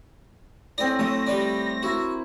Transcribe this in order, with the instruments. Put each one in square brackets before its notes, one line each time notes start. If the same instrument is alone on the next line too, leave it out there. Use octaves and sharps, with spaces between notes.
[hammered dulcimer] A2 C4 [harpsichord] D5 D#6 [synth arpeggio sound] A#6
[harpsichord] F#3 D#6 [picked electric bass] A3
[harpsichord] G3 B4 D5
[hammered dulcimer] E4 A#4 [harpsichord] F#4